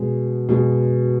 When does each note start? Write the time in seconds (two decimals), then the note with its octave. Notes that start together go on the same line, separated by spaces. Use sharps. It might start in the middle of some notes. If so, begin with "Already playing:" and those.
Already playing: B2 G#3
0.49 B2 G#3